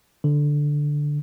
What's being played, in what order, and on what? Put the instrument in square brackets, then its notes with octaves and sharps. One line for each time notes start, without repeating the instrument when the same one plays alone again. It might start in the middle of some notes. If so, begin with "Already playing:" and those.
[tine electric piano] D3